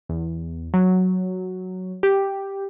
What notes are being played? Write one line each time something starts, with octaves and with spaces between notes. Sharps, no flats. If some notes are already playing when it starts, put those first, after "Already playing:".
E2
F#3
G4